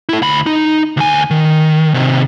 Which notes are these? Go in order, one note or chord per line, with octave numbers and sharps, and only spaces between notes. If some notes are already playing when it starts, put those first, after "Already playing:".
E4 A4
D2 B5
D#4
D2 G#5
D#3
C3 D#3